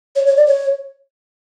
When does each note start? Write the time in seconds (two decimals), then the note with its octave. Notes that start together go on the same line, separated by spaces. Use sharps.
0.16 C#5
0.26 C#5
0.37 D5
0.47 C#5